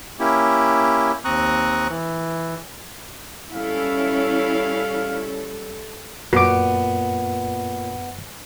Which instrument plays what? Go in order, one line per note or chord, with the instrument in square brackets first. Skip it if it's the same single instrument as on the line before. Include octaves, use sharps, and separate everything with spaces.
[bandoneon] A#3 C#4 E4 G4
D#2 C4 A#5 C#6 D#6 F#6
E3
[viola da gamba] G3 A4 [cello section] C#4 E4 [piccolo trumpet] F5
[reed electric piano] F#2 [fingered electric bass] A#2 [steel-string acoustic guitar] B3 [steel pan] F#4 D6